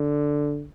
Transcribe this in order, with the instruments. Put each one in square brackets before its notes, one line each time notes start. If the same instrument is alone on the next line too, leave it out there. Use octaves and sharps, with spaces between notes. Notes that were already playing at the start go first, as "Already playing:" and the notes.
Already playing: [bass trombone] D3